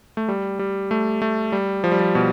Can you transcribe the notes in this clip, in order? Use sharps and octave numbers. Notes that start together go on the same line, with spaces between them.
A3
G3
G3
A3
A3
G3
F3
G3
F3
B2